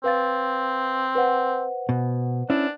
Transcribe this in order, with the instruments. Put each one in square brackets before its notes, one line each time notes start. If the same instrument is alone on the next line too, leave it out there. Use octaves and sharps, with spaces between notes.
[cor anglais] C4 [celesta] B4 F5 A6
[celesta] B4 C5 F#5
[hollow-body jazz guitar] B2
[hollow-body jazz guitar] C#4 E4 [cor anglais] D4